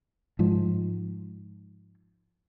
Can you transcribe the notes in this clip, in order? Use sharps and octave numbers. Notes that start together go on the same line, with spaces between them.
G#2 F3